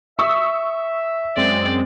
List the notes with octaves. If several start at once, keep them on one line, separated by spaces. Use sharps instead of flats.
E5 C#6 D#6 E6
F#2 G#3 C4 D5